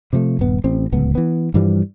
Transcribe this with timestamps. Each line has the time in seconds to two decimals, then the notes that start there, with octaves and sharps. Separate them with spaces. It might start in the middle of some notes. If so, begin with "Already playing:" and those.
0.13 C3 F3 F#3 A3
0.39 D#1 G2 B3
0.64 A1 C4
0.92 D1 C#2 B3
1.15 E3 B3
1.54 G2 E3 F3 G3